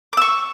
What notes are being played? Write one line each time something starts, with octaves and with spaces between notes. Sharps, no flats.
C#6 D6 E6